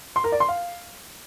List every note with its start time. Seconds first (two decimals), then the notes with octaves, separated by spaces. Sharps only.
0.16 C6
0.24 A#4
0.32 D5
0.40 C6
0.49 F5